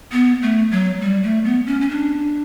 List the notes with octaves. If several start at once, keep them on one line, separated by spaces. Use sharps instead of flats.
B3
A3
F#3
G3
A3
B3
C#4
C#4
D4